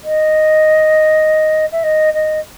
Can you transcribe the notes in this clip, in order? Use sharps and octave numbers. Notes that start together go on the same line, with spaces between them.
D#5
E5
D#5
D#5